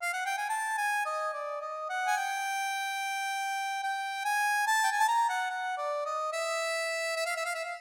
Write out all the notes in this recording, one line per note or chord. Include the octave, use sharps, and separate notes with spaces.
F5
F#5
G5
G#5
A5
G#5
D#5
D5
D#5
F#5
G#5
G5
G5
G#5
A5
G5
G#5
A5
A#5
F#5
F#5
D5
D#5
E5
E5
F5
E5
F5
E5
F5